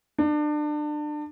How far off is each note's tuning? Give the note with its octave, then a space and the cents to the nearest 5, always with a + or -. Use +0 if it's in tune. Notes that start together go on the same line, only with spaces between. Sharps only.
D4 +30